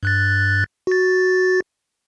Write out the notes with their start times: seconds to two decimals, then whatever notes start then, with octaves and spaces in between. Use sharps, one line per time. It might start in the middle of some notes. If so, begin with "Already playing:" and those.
0.03 G2 F#6 A6
0.87 F#4 A6